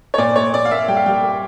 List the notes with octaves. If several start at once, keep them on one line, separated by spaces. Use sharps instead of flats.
C#5
A#2 D5
A#2 C#5
A#2 D5
F5
A#3 E5
G3 G5
F5
G3 G5
A#3